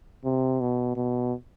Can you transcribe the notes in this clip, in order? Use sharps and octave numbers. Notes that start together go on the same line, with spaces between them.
C3
B2
B2